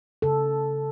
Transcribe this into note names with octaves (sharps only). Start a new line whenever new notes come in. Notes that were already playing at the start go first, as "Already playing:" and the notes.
C#3 A4